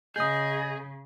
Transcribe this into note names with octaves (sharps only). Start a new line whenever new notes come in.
C#3 G#4 D#5 D#6 G6